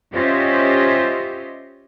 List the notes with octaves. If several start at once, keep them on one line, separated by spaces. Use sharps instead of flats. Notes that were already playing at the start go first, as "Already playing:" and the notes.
C#4 F4 G4 C5 D#5 E5